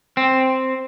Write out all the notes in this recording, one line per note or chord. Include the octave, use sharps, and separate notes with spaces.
C4